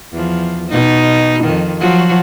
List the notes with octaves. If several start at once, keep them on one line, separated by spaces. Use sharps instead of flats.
E2 F3
B2 D#4
F2 D#3
F3 F#3 F#4